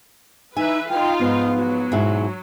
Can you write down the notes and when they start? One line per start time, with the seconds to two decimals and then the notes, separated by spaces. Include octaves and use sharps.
0.57 E3 D#4 B4 E5 G#5
0.89 D#4 F4 F5 G5
1.20 G#2 F3 B3
1.56 F#3
1.92 G#2 B2 E4